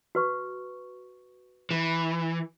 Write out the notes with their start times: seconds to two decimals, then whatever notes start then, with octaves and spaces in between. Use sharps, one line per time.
0.15 F#4 B4 C#6
1.71 E3